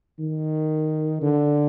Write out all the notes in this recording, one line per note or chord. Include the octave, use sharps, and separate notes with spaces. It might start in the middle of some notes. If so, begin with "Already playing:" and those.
D#3
D3